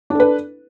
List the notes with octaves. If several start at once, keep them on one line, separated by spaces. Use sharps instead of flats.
D4 A4 B4